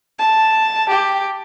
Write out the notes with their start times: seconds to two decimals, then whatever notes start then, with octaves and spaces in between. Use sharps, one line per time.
0.19 A5
0.89 G4